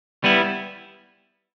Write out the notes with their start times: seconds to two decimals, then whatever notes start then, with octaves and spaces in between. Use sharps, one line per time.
0.24 G3 B3 E4